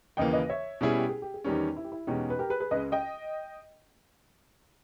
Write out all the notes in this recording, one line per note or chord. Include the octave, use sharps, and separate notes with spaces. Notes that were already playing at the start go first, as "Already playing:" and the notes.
D#2 C#3 E3 A#3 D#5 G5
B4 D#5
C#5 E5
B2 G3 C#4 E4 G#4
G4
G#4
G4
G#4
E2 D#3 G3 C#4 D#4 G4
E4
G4
E4
E2 B2 G#3 C#4 D#4 G4
B4
G4 A#4
G#4 B4
G#4 B4
C#2 C#3 G#3 B4 D#5
D#5 G5